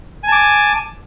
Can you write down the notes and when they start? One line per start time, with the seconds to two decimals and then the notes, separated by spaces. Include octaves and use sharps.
0.23 G#5
0.28 A5
0.32 D6